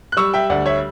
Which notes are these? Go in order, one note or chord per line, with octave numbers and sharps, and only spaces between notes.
F#6
G3 C#6 E6
E5 G5
D2 D5 F#5
C#5 E5